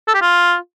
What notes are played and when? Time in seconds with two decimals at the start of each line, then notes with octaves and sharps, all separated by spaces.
0.08 A4
0.15 G4
0.22 F4